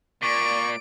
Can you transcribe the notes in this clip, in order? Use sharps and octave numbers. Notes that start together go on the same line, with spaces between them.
A#2 D5 C#6 D7